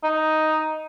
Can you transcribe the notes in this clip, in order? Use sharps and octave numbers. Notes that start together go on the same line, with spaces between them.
D#4